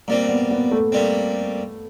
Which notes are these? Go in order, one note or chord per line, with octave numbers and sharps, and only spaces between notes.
A#2 G3 A#3 C4
B3
B3
A3
A#2 G3 C4